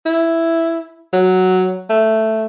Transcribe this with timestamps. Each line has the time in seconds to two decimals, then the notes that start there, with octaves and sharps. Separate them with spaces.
0.06 E4
1.13 F#3
1.90 A3